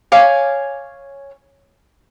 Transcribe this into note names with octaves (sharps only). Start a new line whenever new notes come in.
C#5 F5 G#5 D6